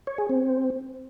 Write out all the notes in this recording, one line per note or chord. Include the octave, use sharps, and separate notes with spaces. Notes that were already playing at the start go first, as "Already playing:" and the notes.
C#5
G#4
C4